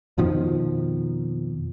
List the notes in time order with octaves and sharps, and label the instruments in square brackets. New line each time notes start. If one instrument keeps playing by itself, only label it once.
[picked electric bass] F2 B2 D#3 F3